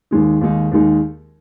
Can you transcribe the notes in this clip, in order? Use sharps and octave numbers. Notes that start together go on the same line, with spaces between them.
D#2 D#3 G#3 D#4
D#2 D#3 G#3 D#4
D#2 D#3 G#3 D#4